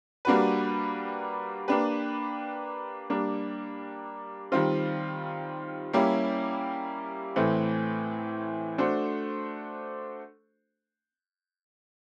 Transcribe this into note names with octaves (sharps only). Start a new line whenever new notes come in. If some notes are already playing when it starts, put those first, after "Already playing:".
G3 A#3 D4 F#4 B4
A#3 D4 G4 B4
G3 A#3 D4
D#3 G3 C4 F4
G3 A#3 C#4 E4 G4
A2 E3 A3 C4
A3 D4 F#4 A4 C5